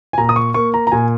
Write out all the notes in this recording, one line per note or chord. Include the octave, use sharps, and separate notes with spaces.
G#5
A#2 A#5
D#6
C#6
A#3 C#6
A#5
A#5
A#2 G#5